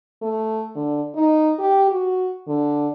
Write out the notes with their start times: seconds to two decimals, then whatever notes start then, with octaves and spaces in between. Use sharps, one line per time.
0.22 A3
0.75 D3
1.15 D#4
1.59 G4
1.91 F#4
2.48 D3